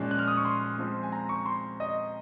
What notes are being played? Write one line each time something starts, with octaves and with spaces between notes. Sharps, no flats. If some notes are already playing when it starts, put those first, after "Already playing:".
Already playing: A#2 F3 G#3 C#4 F#6
F#6
F6
D#6
C#6
C6
F3 G#3 C4
G#5
A#5
C#6
C6
D#5